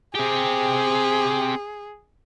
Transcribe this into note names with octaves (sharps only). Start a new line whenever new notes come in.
C4 G4 G#4